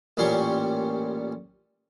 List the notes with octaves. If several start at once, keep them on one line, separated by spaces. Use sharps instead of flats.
A1 A#2 G3 C#4 C6 C#6